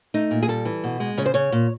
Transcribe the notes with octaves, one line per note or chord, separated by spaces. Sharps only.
A3 D#4
A#2
G#4
G3 A4
E3
B2
G#3
C#3 C#5
C5
C#3 C#5
A#2